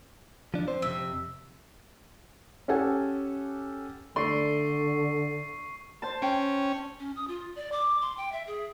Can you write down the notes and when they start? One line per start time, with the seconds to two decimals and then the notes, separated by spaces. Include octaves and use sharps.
0.54 F3 D4
0.67 C4 C5
0.82 F2 A2 C3 E5
2.68 C#4 G4 A4 F#5 G#5
4.16 D3 A3 D5 C6 C#6 C7
6.02 C5 A5
6.22 C#4 G5
7.00 C#4
7.16 D#6
7.28 F4
7.56 D5
7.72 D6
8.01 C6
8.17 G5
8.32 E5
8.47 G#4